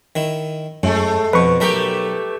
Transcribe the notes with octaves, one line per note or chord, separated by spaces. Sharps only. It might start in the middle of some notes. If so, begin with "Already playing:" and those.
D#3 E4
F#2 A2 G#3 A3
F2 B2 B4 C#6
B1 A3 G4 A#4 B5